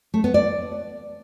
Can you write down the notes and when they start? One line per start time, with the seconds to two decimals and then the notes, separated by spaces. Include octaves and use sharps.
0.14 A3
0.24 B3
0.34 D5